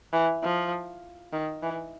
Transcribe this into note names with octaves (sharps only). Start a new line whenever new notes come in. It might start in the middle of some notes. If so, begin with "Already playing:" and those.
E3
F3
D#3
E3